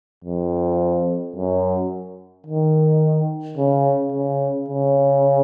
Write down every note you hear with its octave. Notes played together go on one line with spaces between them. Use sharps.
F2
F#2
D#3
C#3
C#3
C#3